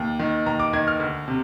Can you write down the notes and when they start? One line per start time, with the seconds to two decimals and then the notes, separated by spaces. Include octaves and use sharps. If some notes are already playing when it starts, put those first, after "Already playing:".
Already playing: D#2
0.19 D#3
0.46 D#2 A#5
0.60 D6
0.73 D#3 G#6
0.88 F6
1.00 D2
1.28 C3